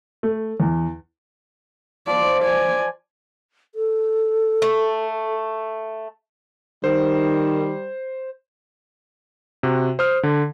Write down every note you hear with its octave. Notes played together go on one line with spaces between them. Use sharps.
A3
E2
F3 D5
D5 G#5
A4
A3
D#3 G3 C5
C3 F#4
C5 D#6 F6
D3